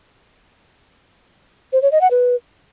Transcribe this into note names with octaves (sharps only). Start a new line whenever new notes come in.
C5
C#5
D#5
F#5
B4